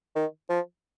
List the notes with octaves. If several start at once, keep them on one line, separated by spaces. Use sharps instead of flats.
D#3
F3